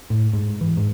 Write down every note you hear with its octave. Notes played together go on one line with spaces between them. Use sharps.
A2
G#2
E3
G#2